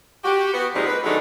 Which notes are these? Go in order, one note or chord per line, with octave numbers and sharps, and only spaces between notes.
F#4 G4
B3 F#4
A#2 F3 G3 G#3 C4 D#4
B4
D#3 F#3 G#3 A3 D4 D#4